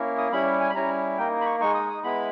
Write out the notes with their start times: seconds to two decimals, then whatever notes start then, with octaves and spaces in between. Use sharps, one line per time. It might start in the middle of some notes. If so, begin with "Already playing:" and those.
Already playing: A#3 C#4 E4
0.18 D#6
0.32 G3 C#4 E4 B5
0.60 G#5
0.70 B5
0.75 G3 C#4 E4 A#5
1.18 A#3 D#4 G5
1.41 B5
1.46 C#6
1.60 G#3 D#4 C#6
1.75 D#6
1.90 D#6
2.04 G#3 B3 E4 B5